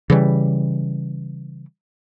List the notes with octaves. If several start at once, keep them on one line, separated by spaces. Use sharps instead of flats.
C#3 E3 G3